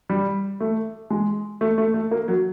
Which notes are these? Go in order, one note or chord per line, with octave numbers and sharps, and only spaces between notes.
G3
A3
G#3
A3
A3
A3
A#3
F#3